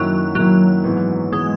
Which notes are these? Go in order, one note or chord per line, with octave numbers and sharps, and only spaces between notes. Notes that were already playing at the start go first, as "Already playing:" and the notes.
Already playing: F#2 D#3 F#3 A#3 E4
F#2 D#3 F#3 A#3 E4
G#2 E3 B3
E3 G#3 B3